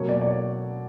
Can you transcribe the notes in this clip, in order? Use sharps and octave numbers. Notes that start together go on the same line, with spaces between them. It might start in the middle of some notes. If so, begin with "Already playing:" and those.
Already playing: B2 F#3 A#3 C#5
D5
D5
C#5